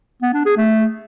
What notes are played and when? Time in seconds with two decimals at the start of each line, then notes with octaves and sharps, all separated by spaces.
0.22 B3
0.34 D4
0.45 G#4
0.57 A3